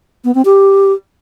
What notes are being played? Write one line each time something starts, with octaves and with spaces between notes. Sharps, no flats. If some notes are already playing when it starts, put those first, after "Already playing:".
B3
C4
G4